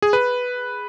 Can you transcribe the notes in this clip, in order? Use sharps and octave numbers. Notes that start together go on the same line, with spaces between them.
G#4
B4